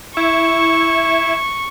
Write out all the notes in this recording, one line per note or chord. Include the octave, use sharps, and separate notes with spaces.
E4 C#6